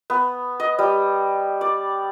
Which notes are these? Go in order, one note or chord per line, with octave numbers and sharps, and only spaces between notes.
B3
D#5
G3
D5